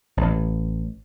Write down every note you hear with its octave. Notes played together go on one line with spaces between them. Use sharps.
A1